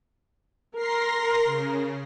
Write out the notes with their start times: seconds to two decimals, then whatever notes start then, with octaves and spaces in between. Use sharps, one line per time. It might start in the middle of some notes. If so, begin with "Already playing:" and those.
0.75 A#4 C6 A#6 C7
1.45 C#3